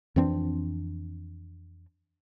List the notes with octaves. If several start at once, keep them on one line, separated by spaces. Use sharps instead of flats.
F2 E3 C4 D4